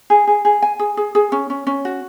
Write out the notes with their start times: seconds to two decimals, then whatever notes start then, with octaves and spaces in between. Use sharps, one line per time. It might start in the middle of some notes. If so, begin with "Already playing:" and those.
0.10 G#4
0.27 G#4
0.45 G#4
0.62 G#5
0.79 G#4
0.97 G#4
1.15 G#4
1.32 C#4
1.50 C#4
1.67 C#4
1.85 F#4